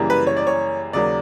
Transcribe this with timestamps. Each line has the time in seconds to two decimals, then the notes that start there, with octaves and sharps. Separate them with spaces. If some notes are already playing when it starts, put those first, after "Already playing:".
Already playing: F#2 C#3 E3 G3 A#3
0.10 B4
0.27 C#5
0.37 D5
0.47 C#5
0.93 D#2 C#3 F#3 A#3 D5